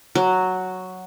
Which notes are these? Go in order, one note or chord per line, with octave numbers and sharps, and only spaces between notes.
F#3